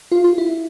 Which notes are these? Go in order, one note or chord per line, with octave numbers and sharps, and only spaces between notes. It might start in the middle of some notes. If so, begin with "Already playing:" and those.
F4
F4
E4